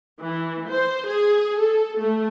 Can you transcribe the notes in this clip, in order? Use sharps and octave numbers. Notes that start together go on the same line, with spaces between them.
E3
C5
G#4
A4
A3